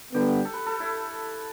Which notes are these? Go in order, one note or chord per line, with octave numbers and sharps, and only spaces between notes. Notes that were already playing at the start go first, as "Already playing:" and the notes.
D3 G3 B3 G4
A4
B4
A4
E4